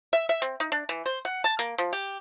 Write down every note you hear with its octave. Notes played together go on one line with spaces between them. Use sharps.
E5
E5
C4
D#4
D4
E3
C5
F#5
A5
A#3
F3
G4